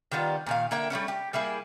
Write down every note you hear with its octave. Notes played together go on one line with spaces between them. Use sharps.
D#3 G3 B3 F4
A#2 D#3 F5
D3 A#3 E5 G5
G3 A3 B3 C#4
G4
G3 A#3 E4 G#4